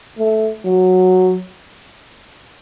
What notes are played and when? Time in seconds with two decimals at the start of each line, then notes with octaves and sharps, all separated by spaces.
0.18 A3
0.65 F#3